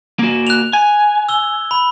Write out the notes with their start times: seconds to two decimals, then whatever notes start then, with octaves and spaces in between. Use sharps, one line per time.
0.19 A#3 F#4
0.47 F#6 F7
0.73 G#5
1.29 E6 G7
1.71 B5